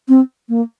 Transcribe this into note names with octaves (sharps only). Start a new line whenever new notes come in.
C4
A#3